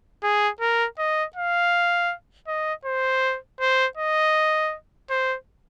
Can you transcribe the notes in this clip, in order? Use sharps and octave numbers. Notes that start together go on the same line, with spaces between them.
G#4
A#4
D#5
F5
D#5
C5
C5
D#5
C5